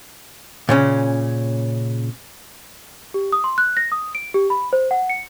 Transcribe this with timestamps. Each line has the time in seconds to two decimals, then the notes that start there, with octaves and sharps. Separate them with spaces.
0.69 A#2 C#3 C#4
3.14 G4
3.32 D#6
3.44 C6
3.58 F#6
3.77 A#6
3.92 D#6
4.15 D7
4.34 G4
4.50 B5
4.73 C5
4.91 F#5
5.09 C#7